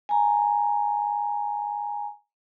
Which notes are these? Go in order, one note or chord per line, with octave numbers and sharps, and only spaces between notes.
G#5 A#5